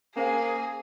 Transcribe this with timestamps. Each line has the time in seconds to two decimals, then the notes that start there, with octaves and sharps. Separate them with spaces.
0.17 A#3 C#4 G#4 C5 F5